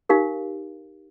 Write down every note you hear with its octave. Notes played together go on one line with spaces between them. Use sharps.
D#4 G4 A#4 F5